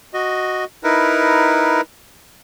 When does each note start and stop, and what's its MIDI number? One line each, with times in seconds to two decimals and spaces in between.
0.14 0.65 66
0.14 0.65 75
0.84 1.81 63
0.84 1.81 64
0.84 1.81 70
0.84 1.81 71